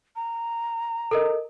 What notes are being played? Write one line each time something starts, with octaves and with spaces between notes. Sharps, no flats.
A#5
A4 A#4 D#5